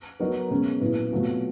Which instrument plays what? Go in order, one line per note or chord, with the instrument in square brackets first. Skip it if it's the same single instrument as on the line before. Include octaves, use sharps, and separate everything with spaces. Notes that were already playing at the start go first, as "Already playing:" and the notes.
[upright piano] F#3 B3 D#4 F#4 A#4
B2 G#3 C#4
A#2 F#3 B3 E4
B2 F#3 A3 C4 F4